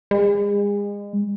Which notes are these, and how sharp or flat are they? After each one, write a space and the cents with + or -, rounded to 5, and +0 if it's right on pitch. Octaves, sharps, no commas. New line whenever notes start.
G#3 -35